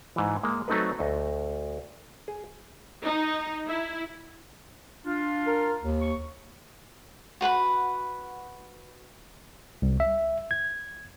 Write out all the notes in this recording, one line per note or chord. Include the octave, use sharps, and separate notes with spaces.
G#2 E3
G#3 A#3
F#3 A3 C4 D#4 A4 B4
D2 D#5
G#4
D#4
E4
D4 F4
A#4
D#2
C#6
F#4 B4 F#5 B5
C2
E5
G#6